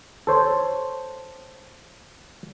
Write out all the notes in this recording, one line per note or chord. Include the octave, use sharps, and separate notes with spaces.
A4 C5 C#5